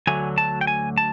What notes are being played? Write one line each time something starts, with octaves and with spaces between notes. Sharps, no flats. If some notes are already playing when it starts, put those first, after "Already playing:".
D2 D3 F#3 A3 G#5
A5
G5
G#5
A5